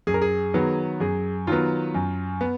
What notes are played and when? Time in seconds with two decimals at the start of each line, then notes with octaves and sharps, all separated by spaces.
0.07 F#2 G#4
0.14 A#4
0.22 G#4
0.54 D#3 F#3 B3
1.00 F#2 G#4
1.47 D#3 F#3 B3 F4
1.94 F#2
2.41 B3